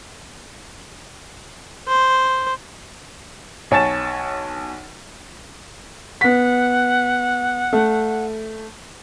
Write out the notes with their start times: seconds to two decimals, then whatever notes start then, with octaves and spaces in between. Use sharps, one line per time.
1.87 C5
3.71 B1 C#5 G#5 A5 A6 E7
6.21 B3 F#5 B6
7.73 A3